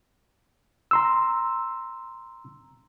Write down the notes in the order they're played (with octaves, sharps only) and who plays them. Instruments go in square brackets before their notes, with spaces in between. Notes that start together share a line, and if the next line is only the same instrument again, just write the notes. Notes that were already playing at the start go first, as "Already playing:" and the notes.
[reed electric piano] A#5 C6 E6